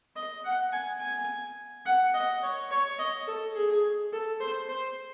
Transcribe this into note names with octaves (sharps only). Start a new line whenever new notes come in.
D#5
F#5
G#5
G#5
F#5
D#5
C#5
C#5
D#5
A4
G#4
A4
C5
C5